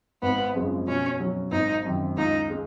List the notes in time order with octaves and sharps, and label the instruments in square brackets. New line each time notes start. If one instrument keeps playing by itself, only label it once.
[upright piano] G#1 [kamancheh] B3
[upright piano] F#2 C#3 F3 G#3
[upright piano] B2 [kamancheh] C#4
[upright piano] F#3 C#4
[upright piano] G#1 [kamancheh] D#4
[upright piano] F#2 D#3
[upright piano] C#2 [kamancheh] D#4
[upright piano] G#3